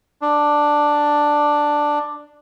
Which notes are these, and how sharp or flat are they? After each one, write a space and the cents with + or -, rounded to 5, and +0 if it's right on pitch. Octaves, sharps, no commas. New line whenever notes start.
D4 +5